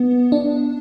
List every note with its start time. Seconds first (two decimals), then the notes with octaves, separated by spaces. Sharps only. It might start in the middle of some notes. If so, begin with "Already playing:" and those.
Already playing: B3
0.32 D4